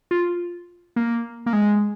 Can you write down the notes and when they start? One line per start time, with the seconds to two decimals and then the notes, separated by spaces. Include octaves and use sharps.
0.11 F4
0.96 A#3
1.46 A#3
1.53 G#3